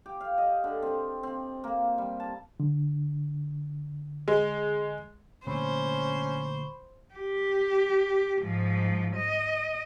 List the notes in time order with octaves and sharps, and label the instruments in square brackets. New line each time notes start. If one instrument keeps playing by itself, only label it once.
[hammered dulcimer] G4
F5
D#5
D3
C4
C4
A#3
G3
A5
[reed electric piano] D3
[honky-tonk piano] G#3
[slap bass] A#2 D3 A3 [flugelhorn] C#4 [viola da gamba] C5 [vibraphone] B5 C#6
[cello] G4
G#2 F3
D#5